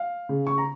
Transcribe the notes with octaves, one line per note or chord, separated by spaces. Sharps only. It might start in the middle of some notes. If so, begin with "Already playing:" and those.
Already playing: F5
C#3
C#6
A#5